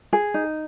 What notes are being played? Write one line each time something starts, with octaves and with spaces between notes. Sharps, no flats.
G#4
D#4